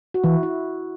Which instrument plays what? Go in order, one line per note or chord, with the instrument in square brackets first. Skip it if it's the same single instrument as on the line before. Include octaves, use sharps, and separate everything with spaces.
[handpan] F#4
[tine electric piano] E3 [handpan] E4
[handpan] E4